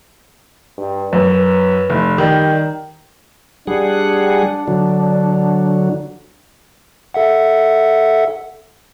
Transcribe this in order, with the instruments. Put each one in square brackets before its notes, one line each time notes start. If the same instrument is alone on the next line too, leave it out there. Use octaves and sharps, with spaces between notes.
[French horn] G2
[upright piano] F#2 [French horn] B4
[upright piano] F1
[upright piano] D#3 [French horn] G3
[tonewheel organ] G3 G#4 F#5 [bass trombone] D4
[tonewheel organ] D3 F#3
[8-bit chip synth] A4 E5 F#5